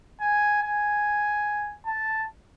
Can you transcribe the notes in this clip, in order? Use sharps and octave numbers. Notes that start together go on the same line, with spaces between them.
G#5
G#5
A5